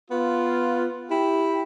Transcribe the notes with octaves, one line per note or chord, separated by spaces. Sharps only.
B3 F4
E4 G4 G5